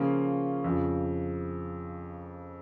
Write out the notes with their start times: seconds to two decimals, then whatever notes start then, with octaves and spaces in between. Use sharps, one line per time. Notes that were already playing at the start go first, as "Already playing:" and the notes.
Already playing: C#3 F3 A#3 C#4 F4
0.64 F2 C#3 F3